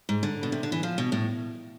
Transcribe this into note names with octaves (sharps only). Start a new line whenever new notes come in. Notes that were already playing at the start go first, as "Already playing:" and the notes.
G#2
D3
B2
C3
D3
E3
F3
B2
A2